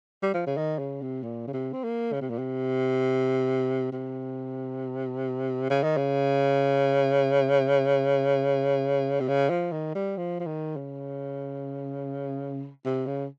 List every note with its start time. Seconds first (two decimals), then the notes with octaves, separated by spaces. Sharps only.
0.23 G3
0.34 F3
0.47 C#3
0.57 D#3
0.79 C#3
1.02 C3
1.23 A#2
1.48 C#3
1.53 C3
1.73 C4
1.84 A#3
2.13 C#3
2.21 C3
2.30 A#2
2.39 C3
3.92 C3
5.70 C#3
5.83 D#3
5.97 C#3
9.20 C3
9.28 C#3
9.50 F3
9.72 D#3
9.95 G3
10.17 F3
10.40 F3
10.46 D#3
10.76 C#3
12.85 C3
13.06 C#3